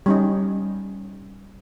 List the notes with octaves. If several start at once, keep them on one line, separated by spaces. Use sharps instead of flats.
G3 C#4 D#4